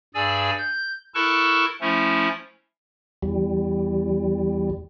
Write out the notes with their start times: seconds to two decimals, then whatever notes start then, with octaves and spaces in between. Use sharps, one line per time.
0.14 G2 G#4 D5 G#5 E6
0.58 G6
1.14 E4 A4 A#4 A5 C#6 F#6
1.81 F3 A3 C#4 E4
3.22 E2 G3